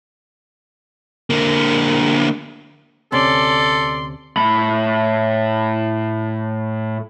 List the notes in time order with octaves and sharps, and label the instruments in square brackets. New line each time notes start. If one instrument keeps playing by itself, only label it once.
[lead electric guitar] D3 A#3
[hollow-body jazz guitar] D2 C3 C#4 [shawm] A4 [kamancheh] D5 [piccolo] C6
[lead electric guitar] A2 B5